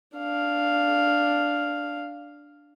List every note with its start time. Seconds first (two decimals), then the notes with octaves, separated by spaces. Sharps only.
0.17 D4 F5